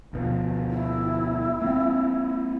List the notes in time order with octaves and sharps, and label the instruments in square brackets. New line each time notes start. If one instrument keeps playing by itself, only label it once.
[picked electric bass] D2 B2 F3
[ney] E4
[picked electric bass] A#3 C4